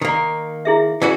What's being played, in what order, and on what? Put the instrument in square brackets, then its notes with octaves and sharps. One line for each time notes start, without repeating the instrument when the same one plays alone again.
[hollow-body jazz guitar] D#3 A#3
[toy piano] E4 G#4 E5
[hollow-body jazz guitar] E3 C#4 F#4